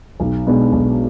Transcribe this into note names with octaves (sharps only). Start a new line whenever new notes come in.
B1
B2 G#3 B3 D4
B1